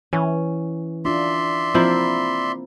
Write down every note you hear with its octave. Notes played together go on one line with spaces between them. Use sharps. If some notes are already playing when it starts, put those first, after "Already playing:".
E3 C#4
D4 F4 D5 E5 C6
F3 A#3 C4 E4